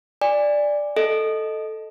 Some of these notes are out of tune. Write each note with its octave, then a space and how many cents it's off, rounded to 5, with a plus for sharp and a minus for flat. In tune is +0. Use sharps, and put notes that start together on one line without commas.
D5 +0 G#5 -25
A4 +0 D#5 +0